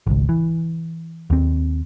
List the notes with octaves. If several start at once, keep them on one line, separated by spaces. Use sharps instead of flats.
G#1 C#2
E3
D#2 C4